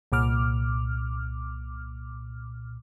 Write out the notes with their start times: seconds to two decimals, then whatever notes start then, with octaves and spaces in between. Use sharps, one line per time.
0.12 C2 A#2 D6 F6